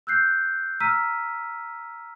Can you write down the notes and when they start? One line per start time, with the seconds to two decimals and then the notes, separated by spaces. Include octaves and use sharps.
0.07 E6 F#6 G6 C7
0.80 A#5 E6 F6 B6 D#7